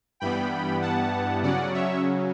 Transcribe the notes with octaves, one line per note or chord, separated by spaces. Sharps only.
G2 E3 G3 B3 G5 B5
F#5 A5
C#3 F#3 C#4 D5 F#5
C#5 E5